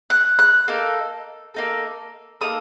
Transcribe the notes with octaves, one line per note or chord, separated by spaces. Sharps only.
F#6
F#6
A#3 D#4 A4
A#3 D#4 A4
A#3 D#4 A4 D#6